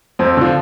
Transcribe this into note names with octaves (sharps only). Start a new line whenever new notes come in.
F2 C4
D3 F3